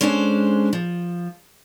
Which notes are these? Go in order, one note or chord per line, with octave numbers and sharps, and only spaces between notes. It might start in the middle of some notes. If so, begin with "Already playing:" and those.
G#3 C#4 D4 A4 C5
F3